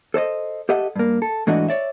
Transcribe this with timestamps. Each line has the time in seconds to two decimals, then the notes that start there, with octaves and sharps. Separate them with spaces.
0.14 A4 C5 D5 D#5
0.69 G4 A4 D#5 E5 F#5
0.96 G2 A#3
1.22 A4
1.47 G#2 E3 A3 D4 F#4 D#5
1.68 C#5 D5 E5